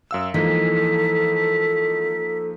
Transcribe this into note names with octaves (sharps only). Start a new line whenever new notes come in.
F#2 F5 E6
E3 F3 G#3 A#3 D#4 A4 B6